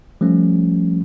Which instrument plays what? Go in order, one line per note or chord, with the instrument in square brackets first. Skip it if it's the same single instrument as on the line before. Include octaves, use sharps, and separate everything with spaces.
[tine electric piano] F3 G3 A3 C#4